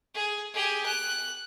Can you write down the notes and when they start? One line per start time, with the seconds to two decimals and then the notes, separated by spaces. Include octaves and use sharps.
0.14 G#4
0.54 G4 G#4
0.86 F#6